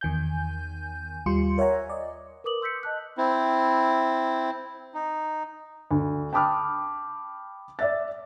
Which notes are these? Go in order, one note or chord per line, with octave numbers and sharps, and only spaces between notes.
E2 D#3 G#5 G6
D#2 G3 F4 C6 C#7
A#4 C#5 E5 F#5 G#5 A#5
D5 D#5
A#4 B4 D6 D#6 F#7
C6 E6 G6 B6 C#7
D#5 A5 F#6
C4 E4
D#4
D2
G5 A5 B5 D6 D#6 F6
D5 E5 A6